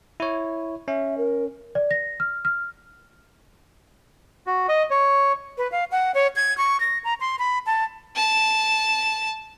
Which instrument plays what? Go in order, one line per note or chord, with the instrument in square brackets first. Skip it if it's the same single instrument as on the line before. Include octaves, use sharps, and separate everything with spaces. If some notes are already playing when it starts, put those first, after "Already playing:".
[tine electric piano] E4 C#5
[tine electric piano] C#4 [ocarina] E5
[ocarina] A#4
[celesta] D5
A#6
F6
F6
[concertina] F#4
D#5
C#5
[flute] B4
F5
F#5
C#5
G#6
C#6
A#6
A#5
C6
B5
A5
[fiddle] A5